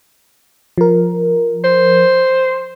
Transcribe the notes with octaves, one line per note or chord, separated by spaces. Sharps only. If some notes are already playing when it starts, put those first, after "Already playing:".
F3 A#4
C5